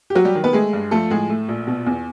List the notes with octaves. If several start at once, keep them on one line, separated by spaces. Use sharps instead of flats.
G4
F#3 F#4
G3 G4
D#3
B3 B4
G#3 A3 G#4
G2
F3 A3 A4
A2 G#3 G#4
A3
A#1
B2
E2